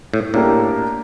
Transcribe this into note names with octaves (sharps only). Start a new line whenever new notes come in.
A2
A2 A#3 D4 G4 A#4